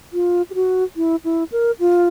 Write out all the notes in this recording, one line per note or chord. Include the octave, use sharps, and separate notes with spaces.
F4
G4
F#4
E4
E4
A#4
F4